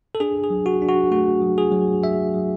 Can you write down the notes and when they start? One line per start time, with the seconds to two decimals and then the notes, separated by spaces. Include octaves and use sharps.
0.15 A4
0.20 D4 G#4
0.44 G#4
0.50 F#3
0.66 F#4
0.82 D4
0.89 F#4
1.11 A3 F#4
1.42 F#3
1.58 G#4
1.72 F#3
2.03 F#3 E5
2.34 F#3